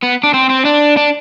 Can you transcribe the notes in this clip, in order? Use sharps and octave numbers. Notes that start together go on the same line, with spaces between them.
B3
D4
C4
C4
D4
D4